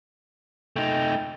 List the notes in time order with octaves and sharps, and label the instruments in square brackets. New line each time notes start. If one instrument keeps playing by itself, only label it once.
[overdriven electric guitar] A3 D#4 [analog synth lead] G5